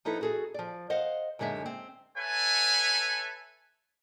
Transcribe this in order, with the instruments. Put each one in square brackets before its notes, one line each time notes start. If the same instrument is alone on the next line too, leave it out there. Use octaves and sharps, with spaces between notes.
[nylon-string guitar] F3 D#4 E4 A4 B4
F#4 G#4 A4
F3 D5
C5 D#5 F5 F#5
F#2 D3 G#3 D#4 E5
C4
[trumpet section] A4 B4 C#5 E5 G#5